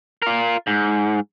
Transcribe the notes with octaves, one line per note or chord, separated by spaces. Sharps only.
F4 A#4
G#2